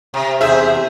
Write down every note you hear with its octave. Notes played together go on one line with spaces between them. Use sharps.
C3
E2 C3 G#4 C5 E5